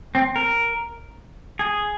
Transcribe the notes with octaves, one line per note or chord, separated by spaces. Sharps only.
C4
A#4
G#4